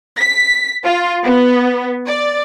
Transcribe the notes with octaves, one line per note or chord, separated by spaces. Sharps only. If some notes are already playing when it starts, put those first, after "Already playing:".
B6
F4
B3
D5